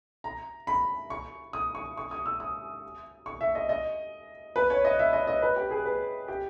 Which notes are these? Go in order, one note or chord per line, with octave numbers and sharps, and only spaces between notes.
A#5
B5
C#6
D#6
C#6
C#6
D#6
E6
D#6
C#6
E5
D#5
D#5
B4
C#5
D#5
E5
D#5
D#5
B4
G4
G#4
B4
G4